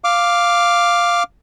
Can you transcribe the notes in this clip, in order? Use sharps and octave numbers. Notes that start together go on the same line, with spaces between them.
F5 D6